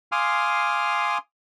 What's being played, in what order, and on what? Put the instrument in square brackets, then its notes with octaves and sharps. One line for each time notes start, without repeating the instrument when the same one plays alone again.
[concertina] F5 G#5 C6 D6 D#6 F6